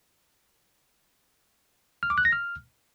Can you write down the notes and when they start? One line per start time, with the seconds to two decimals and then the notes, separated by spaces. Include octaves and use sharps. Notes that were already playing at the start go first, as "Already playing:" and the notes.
2.03 F6
2.10 D6
2.18 F#6
2.25 A#6
2.33 F6